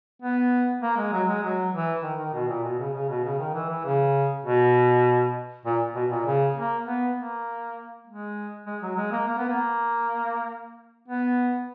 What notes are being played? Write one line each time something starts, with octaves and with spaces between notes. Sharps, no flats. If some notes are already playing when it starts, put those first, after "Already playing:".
B3
A#3
G#3
F#3
G#3
F#3
E3
D#3
D#3
B2
A#2
B2
C#3
C#3
B2
C#3
D#3
E3
E3
C#3
B2
A#2
B2
A#2
C#3
A#3
B3
A#3
G#3
G#3
F#3
G#3
A#3
A#3
B3
A#3
B3